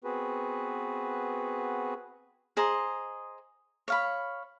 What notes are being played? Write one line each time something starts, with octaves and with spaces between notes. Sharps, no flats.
B3 C4 F#4 G#4 B4
G#4 C5 D#5 A#5
C#5 F5 B5